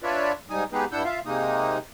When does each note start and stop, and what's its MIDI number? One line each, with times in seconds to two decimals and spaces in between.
0.03 0.32 62
0.03 0.32 65
0.03 0.32 71
0.03 0.32 73
0.03 0.32 74
0.03 0.32 76
0.50 0.64 44
0.50 0.64 55
0.50 0.64 63
0.50 0.64 80
0.50 0.64 87
0.72 0.85 56
0.72 0.85 59
0.72 0.85 63
0.72 0.85 67
0.72 0.85 68
0.72 0.85 71
0.92 1.03 43
0.92 1.03 62
0.92 1.03 64
0.92 1.03 78
0.92 1.03 88
0.92 1.03 91
1.04 1.19 65
1.04 1.19 76
1.04 1.19 77
1.26 1.78 48
1.26 1.78 56
1.26 1.78 58
1.26 1.78 63
1.26 1.78 87